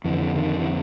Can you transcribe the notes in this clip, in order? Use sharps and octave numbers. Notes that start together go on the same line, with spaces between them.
F2 D3 E3
D#3
E3